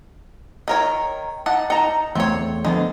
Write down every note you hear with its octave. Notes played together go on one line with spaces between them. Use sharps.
D#3 A#4 C#5
D#4 F#5 A5
D#4 F#5 A5 A#5
E2 A3 C4 C#5
D3 F3 G#3 B3